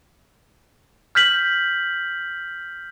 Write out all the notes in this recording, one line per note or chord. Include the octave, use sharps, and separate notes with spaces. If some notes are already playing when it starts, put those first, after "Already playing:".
F6 G6 B6 F#7